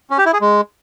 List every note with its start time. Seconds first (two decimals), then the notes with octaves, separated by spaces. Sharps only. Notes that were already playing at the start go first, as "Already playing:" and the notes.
0.10 C#4
0.18 G4
0.26 E4
0.33 G#4
0.41 G#3